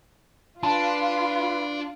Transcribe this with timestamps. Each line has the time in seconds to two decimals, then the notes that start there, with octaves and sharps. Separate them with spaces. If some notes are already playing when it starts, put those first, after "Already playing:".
0.63 D4 F4 B4 A5